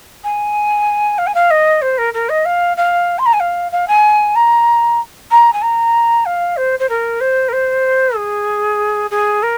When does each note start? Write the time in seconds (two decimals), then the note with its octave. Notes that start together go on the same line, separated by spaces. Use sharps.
0.23 G#5
1.18 F5
1.26 G#5
1.34 F5
1.50 D#5
1.81 C5
1.98 A#4
2.14 A#4
2.29 D#5
2.45 F5
2.77 F5
3.18 C6
3.26 A#5
3.33 G#5
3.40 F5
3.72 F5
3.88 G#5
4.35 A#5
5.31 A#5
5.53 G#5
5.62 A#5
6.25 F5
6.57 C5
6.79 C5
6.89 A#4
7.20 C5
7.48 A#4
7.52 C5
8.16 G#4
9.11 G#4
9.42 A#4